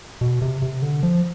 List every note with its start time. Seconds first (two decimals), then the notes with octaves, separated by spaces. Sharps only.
0.21 B2
0.42 C3
0.62 C3
0.82 D3
1.03 F3